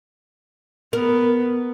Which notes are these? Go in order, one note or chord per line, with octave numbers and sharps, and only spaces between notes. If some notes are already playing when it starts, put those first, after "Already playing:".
B3 A#4